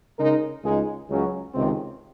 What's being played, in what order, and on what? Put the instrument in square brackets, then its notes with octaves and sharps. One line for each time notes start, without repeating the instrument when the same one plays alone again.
[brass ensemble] C#3 G#3 D#4 A#4
C#2 C#3 G#3 D#4 G#4
C#2 C#3 F#3 C#4
C#2 C3 D#3 G#3 C4